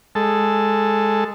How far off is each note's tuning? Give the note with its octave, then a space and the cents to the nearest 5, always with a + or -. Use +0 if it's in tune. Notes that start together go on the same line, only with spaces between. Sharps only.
G#3 -5 A4 +0